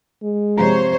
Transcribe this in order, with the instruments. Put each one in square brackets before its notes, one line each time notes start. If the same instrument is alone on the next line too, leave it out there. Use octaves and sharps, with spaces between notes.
[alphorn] G#3
[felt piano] C3 F3 A#5 [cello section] C5 C#5